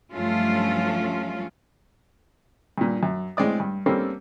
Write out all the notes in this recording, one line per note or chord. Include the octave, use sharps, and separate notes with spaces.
G2 F3 F#3 A3 C#4 F4
G2 A#2
F#2
A2 G#3 C4 D5 D#6
G2
G3 A#3 C4 C#4 A4